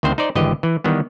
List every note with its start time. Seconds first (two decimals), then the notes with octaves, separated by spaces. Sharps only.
0.03 D2 D#3 C4 C5
0.18 D#4 C5 D5
0.35 G#1 D3 E3 G4 D#5
0.63 E3
0.84 D#3 E3 G3 B3